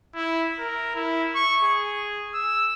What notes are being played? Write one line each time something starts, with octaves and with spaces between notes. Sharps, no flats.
E4
A#4
E4
C#6
G#4
E6